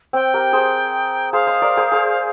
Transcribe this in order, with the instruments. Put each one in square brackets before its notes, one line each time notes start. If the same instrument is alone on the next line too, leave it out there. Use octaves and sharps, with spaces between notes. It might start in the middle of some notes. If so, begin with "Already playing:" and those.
[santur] C4 [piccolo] G5
[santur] G4 A#4
G#4 C5
[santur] G#4 C5 [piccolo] F5
[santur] C5 D#5
A#4 D5
G#4 C5
G#4 C5